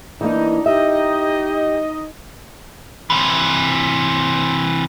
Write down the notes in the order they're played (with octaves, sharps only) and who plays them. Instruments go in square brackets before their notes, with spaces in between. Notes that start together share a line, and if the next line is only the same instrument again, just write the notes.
[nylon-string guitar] E3 A#3 [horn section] D4 D#4 [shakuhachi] D#5
[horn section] D#4 D#5 [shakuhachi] G4 [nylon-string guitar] E5
[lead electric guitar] C3 E3